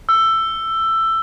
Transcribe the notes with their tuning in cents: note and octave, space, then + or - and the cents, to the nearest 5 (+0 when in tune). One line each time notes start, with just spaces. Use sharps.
E6 +15